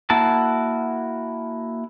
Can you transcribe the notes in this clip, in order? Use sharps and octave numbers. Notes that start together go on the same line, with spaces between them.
A#3 E4 F#4 A5